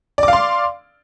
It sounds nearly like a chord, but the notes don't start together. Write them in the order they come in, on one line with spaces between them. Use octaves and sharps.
D5 D6 F5 C6